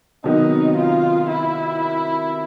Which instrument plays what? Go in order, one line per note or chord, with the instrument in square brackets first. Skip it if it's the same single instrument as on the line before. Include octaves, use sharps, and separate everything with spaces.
[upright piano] C3 D#3 F#3 B3 [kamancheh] D#4
[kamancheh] F4
E4